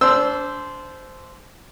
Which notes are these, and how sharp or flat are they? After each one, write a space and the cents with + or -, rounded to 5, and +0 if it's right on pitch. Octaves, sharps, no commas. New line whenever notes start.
D4 -30 C5 -10 E6 +0